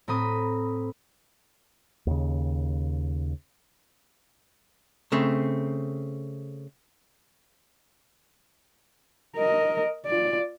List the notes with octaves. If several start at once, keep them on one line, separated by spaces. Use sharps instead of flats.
A2 C4 A#5 B5 D#6
D#2 C#3
C#3 A3 C4
A#4 D#5
F4 D5